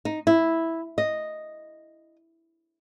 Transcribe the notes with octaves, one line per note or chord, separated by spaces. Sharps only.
D#4
E4
D#5